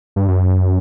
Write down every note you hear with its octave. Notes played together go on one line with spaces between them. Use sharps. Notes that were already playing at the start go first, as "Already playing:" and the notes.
G2
F#2